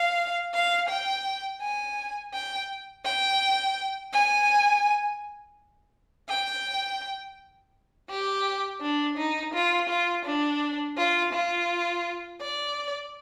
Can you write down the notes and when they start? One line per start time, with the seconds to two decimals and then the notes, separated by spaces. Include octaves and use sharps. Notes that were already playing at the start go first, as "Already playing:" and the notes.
Already playing: F5
0.54 F5
0.89 G5
1.62 G#5
2.34 G5
3.05 G5
4.13 G#5
6.29 G5
8.10 G4
8.81 D4
9.17 D#4
9.54 F4
9.89 F4
10.25 D4
10.97 F4
11.33 F4
12.41 D5